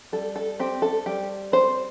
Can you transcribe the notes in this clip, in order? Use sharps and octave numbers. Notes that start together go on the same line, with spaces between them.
G3 A4
A4
C4 G4
A4
G3 G4
C4 C5